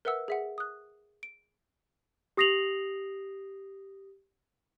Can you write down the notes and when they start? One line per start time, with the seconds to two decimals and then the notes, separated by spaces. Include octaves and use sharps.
0.05 A#4 B4 E5 F#5 E6
0.28 G#4 E5 F#5
0.58 D#6 F#6
1.23 D7
2.37 G4 D#6 A#6 C7 F7 F#7